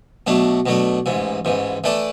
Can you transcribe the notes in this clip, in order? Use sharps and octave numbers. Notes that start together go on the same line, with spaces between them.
B2 F#3 A3 D4
B2 F#3 A3 D4
A1 G#2 E3
A1 G#2 E3
E3 A3 D4 A4 D5